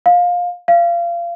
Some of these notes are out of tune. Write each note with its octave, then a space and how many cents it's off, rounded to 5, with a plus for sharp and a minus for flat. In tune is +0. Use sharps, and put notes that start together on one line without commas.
F5 +20
F5 -25